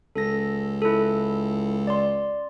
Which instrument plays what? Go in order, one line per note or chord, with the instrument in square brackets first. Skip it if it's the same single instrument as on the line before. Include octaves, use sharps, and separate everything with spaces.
[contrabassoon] C#2 [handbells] A4 A#6
[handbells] E4 A4
D5 C6